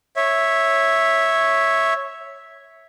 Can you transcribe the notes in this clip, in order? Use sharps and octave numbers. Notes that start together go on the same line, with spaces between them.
C#5 E5